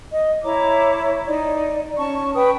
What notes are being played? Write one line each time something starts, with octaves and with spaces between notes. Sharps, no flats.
D#5
E4 C#5 A#5 D6
D#4 D5
C#4 A5 C#6
B4 G5 D#6